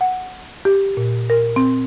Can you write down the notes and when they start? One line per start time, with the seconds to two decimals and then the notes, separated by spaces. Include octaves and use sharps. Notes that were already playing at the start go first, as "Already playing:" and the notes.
0.01 F#5
0.65 G4
0.97 A#2
1.30 A#4
1.56 C4